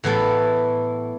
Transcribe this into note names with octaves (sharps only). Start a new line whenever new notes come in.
A2 E3 B3 A4